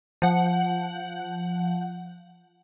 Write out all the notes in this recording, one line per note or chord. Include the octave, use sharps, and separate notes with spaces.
F3 F#5